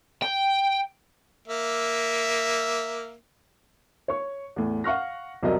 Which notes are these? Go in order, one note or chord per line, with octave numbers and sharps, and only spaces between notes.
G5
A#3 E5
C#5 C#6
E2 A2
F5 F#5 C#6 F6 A#6
C2 F2 F#3 A#4 D#5 D#6